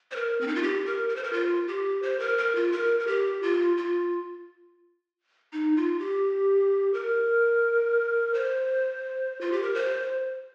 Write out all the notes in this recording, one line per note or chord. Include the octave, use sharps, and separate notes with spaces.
C5
A#4
C4
D#4
F4
G4
A#4
A#4
C5
A#4
F4
G4
C5
A#4
A#4
F4
A#4
A#4
G4
F4
F4
D#4
F4
G4
A#4
C5
F4
G4
A#4
C5